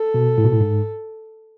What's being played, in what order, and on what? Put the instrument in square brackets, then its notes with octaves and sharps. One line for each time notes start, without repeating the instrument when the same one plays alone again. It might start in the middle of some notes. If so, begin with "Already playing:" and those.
Already playing: [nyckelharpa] A4
[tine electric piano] B2
A2
B2
A2
G#2